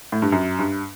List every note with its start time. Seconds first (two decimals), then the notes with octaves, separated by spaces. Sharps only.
0.12 A2
0.22 G2
0.32 F#2
0.59 G2